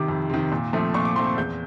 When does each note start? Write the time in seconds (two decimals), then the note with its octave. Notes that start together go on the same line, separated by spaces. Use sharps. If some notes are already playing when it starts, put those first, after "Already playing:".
Already playing: C3 D#3 D6
0.08 F2
0.30 C3 D#3
0.51 A#2
0.73 F3 A3 C4
0.94 A#2 C#6
1.05 D6
1.16 F3 A3 C4 C6
1.27 C#6
1.37 E2 G6